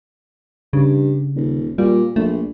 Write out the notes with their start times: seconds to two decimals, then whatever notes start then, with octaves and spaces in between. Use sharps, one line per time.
0.73 G2 C#3
1.36 D#1
1.78 A#2 G3
2.16 A#1 A3